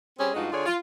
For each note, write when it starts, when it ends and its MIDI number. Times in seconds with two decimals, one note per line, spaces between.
0.18 0.31 55
0.18 0.31 60
0.18 0.31 61
0.18 0.31 68
0.34 0.47 43
0.34 0.47 56
0.34 0.47 63
0.34 0.47 65
0.34 0.47 66
0.51 0.65 50
0.51 0.65 65
0.51 0.65 68
0.51 0.65 73
0.51 0.65 74
0.66 0.74 65